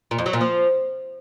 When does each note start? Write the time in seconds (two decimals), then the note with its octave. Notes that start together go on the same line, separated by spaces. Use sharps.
0.11 A#2
0.18 F2
0.26 F#3
0.33 A#2
0.41 F3